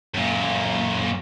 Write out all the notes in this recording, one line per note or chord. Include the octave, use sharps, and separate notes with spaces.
F#2 A#2